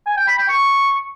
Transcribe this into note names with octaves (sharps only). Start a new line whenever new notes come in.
G#5
G5
B5
G5
C#6